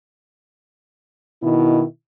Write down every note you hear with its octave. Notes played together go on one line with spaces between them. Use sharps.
B2 D#3 E4